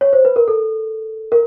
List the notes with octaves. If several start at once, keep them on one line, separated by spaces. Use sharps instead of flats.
C#5
C5
B4
A#4
A4
A#4